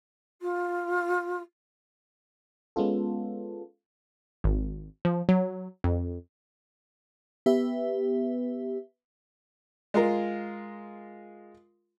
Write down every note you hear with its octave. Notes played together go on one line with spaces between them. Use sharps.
F4
G#3 B3 C#4 F4 A4
G#1
F3
F#3
F2
B3 G4 B4 E5
G#3 F4 A#4